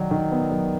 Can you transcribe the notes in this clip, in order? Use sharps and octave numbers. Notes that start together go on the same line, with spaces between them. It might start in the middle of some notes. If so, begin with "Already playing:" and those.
Already playing: D#3 F#3 D#4 D5
D#3
B3
F#3